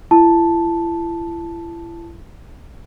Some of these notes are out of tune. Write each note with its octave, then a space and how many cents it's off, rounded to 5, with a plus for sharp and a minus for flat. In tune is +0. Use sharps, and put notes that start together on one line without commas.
E4 +35 A5 +0